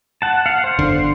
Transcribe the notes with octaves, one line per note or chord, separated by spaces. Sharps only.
F#5 A5
F5 F#5
C5
G1 D3